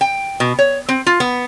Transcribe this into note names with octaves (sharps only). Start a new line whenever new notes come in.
G5
B2
C#5
C4
F4
B3